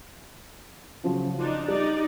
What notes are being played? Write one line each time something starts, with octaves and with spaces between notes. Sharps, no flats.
C#3 F3 F#3
D4 D#4 F4
G3 D#4 D5